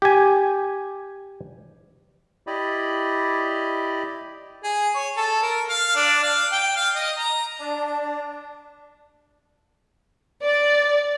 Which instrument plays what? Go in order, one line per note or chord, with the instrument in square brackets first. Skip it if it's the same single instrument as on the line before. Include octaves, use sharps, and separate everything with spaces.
[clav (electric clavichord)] G4 G#5
[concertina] E4 G4 D5 D#5 B5
[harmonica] G#4
C#5
A4
A#4
F5
D4
F5
G5
F5
D#5
A#5
[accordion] D4
[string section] D5